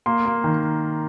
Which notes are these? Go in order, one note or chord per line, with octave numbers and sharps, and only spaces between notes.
A#3 C6
A#3
D#3